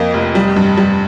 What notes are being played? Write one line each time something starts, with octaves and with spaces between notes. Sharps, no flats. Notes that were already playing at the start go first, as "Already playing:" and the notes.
Already playing: F2 A#3 D#5
F1
G3
G2
G3